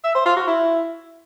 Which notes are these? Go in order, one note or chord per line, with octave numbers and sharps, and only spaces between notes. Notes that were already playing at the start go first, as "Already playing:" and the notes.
E5
C5
F4
F#4
E4